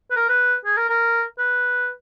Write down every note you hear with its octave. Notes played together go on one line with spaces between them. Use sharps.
B4
A#4
B4
G#4
A#4
A#4
B4